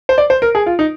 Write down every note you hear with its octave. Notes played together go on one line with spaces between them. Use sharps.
C5
D5
C5
A#4
G#4
F4
D#4